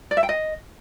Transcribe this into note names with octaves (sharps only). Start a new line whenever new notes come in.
D5
E5
G5
D#5